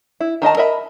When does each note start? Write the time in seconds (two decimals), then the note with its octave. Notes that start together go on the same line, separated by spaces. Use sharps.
0.20 E4
0.42 D#3 D#4 D#5 A5
0.57 A#4 D#5 E5 B5